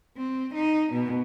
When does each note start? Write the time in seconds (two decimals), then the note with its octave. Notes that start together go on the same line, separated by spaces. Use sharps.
0.17 C4
0.54 D#4
0.93 B2